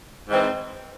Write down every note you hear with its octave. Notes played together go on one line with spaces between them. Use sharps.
G#2 E3 C4